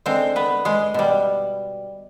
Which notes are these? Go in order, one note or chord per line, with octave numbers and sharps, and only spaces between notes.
D3 G#3 C4 C5
B3 B4
G#3 G#4
B2 G3